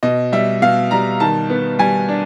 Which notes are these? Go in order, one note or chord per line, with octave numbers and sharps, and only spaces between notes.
B2 D#5
G3 E5
B2 F5
G3 A#5
D#3 A5
B3
G3 G#5
D4